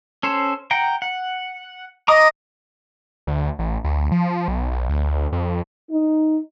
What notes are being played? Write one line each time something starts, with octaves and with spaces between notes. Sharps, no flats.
C#4 A4 C5
F#5 G5 A#5
F#5
D#5 A#5 D6 D#6
D2
A1
D2
F3
B1
B1
D2
F2
D#4